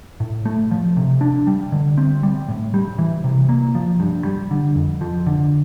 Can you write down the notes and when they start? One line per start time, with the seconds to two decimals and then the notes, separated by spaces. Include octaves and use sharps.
0.20 A2
0.46 A3
0.71 F3
0.97 C3
1.21 D4
1.47 G3
1.72 D3
1.97 C4
2.23 G3
2.49 A2
2.74 G3
2.99 E3
3.24 C3
3.49 A#3
3.75 F3
4.00 G2
4.25 G3
4.51 D3
4.75 F2
5.01 F3
5.27 D3